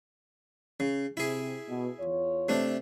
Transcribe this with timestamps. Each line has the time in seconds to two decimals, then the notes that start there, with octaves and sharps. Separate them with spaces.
0.80 C#3
1.17 C3 E4 G#4
1.69 B2
1.99 E2 F4 C#5
2.49 C3 A3 D4